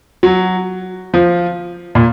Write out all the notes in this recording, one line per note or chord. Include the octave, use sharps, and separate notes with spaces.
F#3
F3
A#2